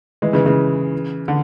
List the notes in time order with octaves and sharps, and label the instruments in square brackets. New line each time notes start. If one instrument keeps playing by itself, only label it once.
[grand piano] E3 G#3
C#3 E3
C#3 E3
D3